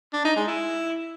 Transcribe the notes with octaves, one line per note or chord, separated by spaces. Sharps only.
D4
D#4
G#3
E4